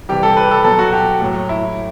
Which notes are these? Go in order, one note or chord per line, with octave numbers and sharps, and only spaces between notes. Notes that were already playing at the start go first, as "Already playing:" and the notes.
C3 E3 G3 G4
A4
B4
G4
A4
B2 F#3 A4
F#4
G4
A2 F#3
E4